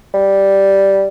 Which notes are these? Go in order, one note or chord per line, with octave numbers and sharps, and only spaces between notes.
G3